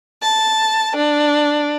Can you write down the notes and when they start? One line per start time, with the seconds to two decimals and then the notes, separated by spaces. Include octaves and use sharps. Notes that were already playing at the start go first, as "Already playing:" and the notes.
0.22 A5
0.95 D4